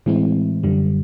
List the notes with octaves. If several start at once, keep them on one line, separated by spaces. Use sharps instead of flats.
A2 E3 G#3 C4 E4
F#2 D3 G3